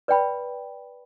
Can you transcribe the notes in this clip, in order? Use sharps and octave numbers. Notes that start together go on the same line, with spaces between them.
B4 D5 G5 B5